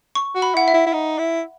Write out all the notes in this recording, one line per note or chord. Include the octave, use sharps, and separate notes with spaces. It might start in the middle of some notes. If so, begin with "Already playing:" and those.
C#6
F#4
B5
E4 F#5
E5
E4
E4
D#4
E4